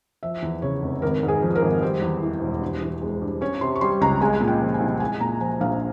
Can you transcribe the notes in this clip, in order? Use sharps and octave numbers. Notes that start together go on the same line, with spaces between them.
F3 E5
E2
C#3 C#5
F1
G#1 A#4
G#2
G#4
F3
A#4
G#1
G3 C5
E2
E3
E1
G2
E3
G#3
G2
C#4 C#5
C3 C6
C#6
G3 C6
C#2 A#5
G#3 G#5
A#2
G5
F3
G#5
C2
G#3 G#5
A#2 A#5
F3 G#5
A#1 F5